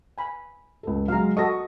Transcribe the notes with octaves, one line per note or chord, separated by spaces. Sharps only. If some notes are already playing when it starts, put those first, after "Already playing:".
G#5 B5
C#2 A4
F#3 G#3 F5 A#5
F#4 A4 D#5 C#6 A#6